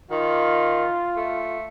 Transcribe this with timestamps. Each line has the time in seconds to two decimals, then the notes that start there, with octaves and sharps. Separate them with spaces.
0.11 D#3 F4
1.17 A3